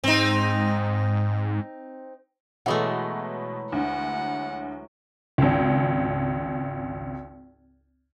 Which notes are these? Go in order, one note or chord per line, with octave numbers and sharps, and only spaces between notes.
G#2 C4 D#4
B2 E3 F#3 G#3 A3 E4 B4 F#5
D2 D3 F#5
G#1 C#2